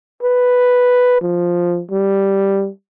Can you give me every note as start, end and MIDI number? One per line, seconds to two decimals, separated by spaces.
0.23 1.19 71
1.21 1.81 53
1.91 2.69 55